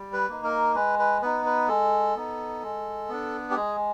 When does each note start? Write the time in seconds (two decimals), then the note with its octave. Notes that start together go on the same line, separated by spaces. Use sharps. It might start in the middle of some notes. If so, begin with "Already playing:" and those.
Already playing: G3
0.13 B4
0.29 A#3 D#4
0.44 A#4
0.75 G#3 B4
0.99 B4
1.22 B3 D#4 B4
1.46 B4
1.68 G#3 A4
2.16 B3 D#4
2.63 G#3
3.09 B3 D4
3.51 G4
3.56 G#3 G#4